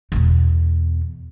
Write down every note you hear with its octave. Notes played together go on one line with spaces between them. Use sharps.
E2 B2